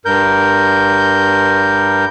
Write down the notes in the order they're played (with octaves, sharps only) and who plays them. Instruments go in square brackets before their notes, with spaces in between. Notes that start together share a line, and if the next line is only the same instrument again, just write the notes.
[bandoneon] G2 A#4 G6